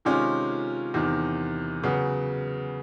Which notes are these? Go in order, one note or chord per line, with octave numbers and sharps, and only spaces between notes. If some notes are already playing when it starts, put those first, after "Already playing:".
C3 D#3 G#3 C#4 F4
E2 C3 D#3
C#3 F#3 B3